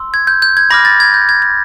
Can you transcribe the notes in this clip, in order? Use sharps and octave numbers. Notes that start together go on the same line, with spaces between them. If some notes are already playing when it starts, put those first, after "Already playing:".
Already playing: C6 E6
G#6
G6
G6
G#6
B5 D6 F6 A#6
A6
G#6
G6
G#6
G#6